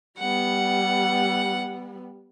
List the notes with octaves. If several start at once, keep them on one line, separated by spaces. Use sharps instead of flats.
G3 B3 F#5